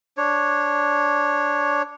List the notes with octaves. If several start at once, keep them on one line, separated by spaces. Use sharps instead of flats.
D4 C#5